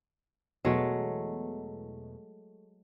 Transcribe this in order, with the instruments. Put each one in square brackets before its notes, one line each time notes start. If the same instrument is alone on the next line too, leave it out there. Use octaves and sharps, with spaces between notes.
[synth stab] E2 B2 [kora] F#3 G#3 A3